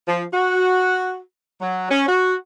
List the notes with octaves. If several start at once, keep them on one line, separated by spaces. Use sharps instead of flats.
F3
F#4
F#3
C#4
F#4